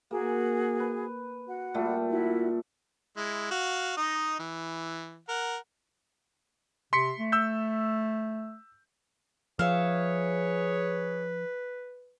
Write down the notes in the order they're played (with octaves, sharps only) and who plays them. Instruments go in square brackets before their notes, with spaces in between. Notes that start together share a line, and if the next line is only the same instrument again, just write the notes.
[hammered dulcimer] A#3 [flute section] F#4 G#4 G#5
[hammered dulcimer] B4
[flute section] F#4 F#5
[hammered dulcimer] A#2 G3 A3
[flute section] E4 F#4
[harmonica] G#3 E4
F#4 F5
D#4 D#5
E3
A#4 F#5
[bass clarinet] C3 [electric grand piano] C6 B6 C#7
[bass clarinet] A3
[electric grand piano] E6 G6
[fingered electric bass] F3 [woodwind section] G#4 C#5 [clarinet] B4 [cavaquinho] E5 F5